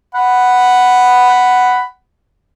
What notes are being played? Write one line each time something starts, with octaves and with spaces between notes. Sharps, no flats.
F#5 B5